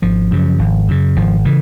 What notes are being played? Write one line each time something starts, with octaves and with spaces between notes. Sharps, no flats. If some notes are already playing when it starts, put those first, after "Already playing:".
G#1 F3
F#2 C#3
G#1
F#2 C#3
G#1 F3
C#3 E3